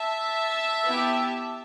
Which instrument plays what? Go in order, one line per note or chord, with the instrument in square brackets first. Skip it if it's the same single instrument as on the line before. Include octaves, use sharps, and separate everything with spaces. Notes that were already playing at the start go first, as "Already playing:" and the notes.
Already playing: [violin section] E5 A5
B3 E4 G4